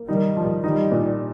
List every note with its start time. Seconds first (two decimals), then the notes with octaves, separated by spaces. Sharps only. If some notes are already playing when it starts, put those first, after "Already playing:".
Already playing: A#3
0.08 D#3 G3 D#4
0.37 F3
0.63 D#3 G3 D#4
0.92 A#2